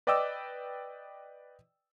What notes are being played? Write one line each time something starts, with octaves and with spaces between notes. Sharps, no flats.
B4 D5 D#5 G5 D6 E6